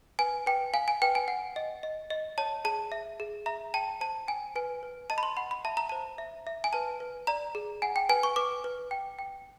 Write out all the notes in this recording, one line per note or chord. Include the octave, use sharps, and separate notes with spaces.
B4 G#5
B4 G5
F5 G#5
G#5
B4 G5
G#5
F#5
D#5
D#5
D#5
C#5 A5
G#4 A5
E5
G#4
E5 A#5
G5 A5
C5 A5
G5 G#5
B4 G#5
B4
D#5 A5
B5
C6
F#5 B5
B5
E5 A5
A#5
C5 A5
E5
E5
G#5
B4 A5
B4
D5 A#5
G#4
F#5 G#5
G5
B4 G#5
C#6
B4 D6
B4
G5
G5